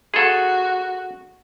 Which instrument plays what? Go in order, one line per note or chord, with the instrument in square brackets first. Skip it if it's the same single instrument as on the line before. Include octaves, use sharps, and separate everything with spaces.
[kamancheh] F#4 [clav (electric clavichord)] G#4 A4